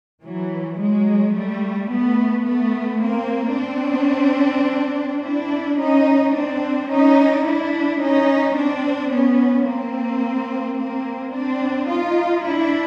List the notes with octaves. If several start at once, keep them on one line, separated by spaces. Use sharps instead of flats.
E3 F#3
F#3 G#3
G3 A3
A3 B3
A3 B3
A#3 C4
C4 D4
D4 E4
C#4 D#4
C4 D4
C#4 D#4
D4 E4
C#4 D#4
C4 D4
B3 C#4
A#3 C4
A#3 C4
C4 D4
D#4 F4
D4 E4